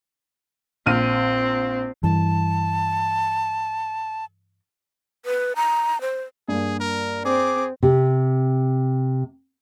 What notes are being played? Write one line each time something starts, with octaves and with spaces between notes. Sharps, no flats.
A#1 C4 F6 D#7
G2 E3 A5
B4
A#5
C5
G2 A#3 G#4
A#4
C4 G#4 D6
C3 G4